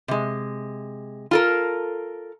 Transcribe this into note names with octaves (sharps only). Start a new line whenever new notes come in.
C3 G#3
F4 A4 A#4